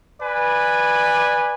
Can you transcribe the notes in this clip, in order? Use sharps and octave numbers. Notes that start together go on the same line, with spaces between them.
B4 D5 G#5